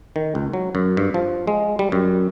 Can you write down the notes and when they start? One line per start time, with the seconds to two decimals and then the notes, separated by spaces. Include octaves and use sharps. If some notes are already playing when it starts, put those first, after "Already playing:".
0.16 D#3
0.35 C#2
0.53 F#3
0.75 F#2
0.97 G2
1.14 F3
1.47 G#3
1.79 G3
1.92 F#2